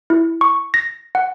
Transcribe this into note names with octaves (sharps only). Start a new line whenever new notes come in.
E4
C#6
A#6
F#5